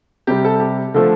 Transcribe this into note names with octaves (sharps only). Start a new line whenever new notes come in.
C3 G3 G4
A4
G4
D3 F3 A3